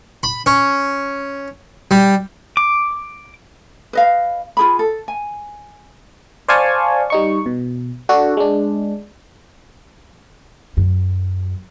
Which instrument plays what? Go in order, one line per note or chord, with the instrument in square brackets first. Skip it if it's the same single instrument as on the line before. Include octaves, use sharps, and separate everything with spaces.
[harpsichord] B5
C#4
G3
[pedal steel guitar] D6
[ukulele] B4 D#5 F5
F4 G#4 B5
A4
G#5
[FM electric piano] C5 D5 F5 G#5 A5 C#6
G3 D#4 C#6
B2
D4 F#4 A4
G#3 D4
[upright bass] F#2